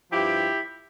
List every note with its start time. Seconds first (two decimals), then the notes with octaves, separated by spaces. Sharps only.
0.12 G2 F3 E4 G4